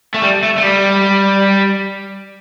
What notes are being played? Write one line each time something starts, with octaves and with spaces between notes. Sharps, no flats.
A3
G3
A3
A3
G3